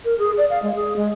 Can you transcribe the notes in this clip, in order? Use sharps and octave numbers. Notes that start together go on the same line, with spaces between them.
A#4
G#4
D5
F5
G#3
G#4
G#3